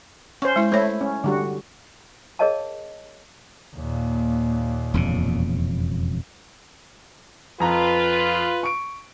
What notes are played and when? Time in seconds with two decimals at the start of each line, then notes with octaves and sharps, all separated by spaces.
0.42 C#4 C5 C#6
0.56 G#3 E4
0.72 A3 E4 C5 C#5
1.01 C#4
1.24 D3 G3 F#4
2.39 G#4 A#4 C#5 D#5 F5 A5
3.75 D#2 A#2
4.94 E1 F2 C#3
7.60 F2 F4 B4 A#5
8.63 C#6 D7